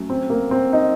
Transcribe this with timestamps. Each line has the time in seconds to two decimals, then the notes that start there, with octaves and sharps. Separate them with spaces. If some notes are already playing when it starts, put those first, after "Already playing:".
Already playing: F#3 A3 C#4
0.10 C4
0.30 A#3
0.51 C4
0.73 D#4